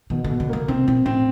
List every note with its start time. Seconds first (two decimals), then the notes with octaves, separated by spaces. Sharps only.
0.10 B2 D#3
0.24 D3
0.30 B2
0.40 D3
0.49 C#3 A#3
0.68 C3 C4
0.87 B2 C4
1.06 A2 C4